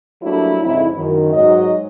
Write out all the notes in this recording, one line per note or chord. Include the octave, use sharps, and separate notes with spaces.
F#3 G3 A3 A#3 D4 E4
F2 G#2 C#3 D#4 E4
F#2 D#3
G#2 F#3 D#5